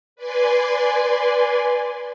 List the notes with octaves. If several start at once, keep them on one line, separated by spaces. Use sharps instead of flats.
B4 D5 G#5 C6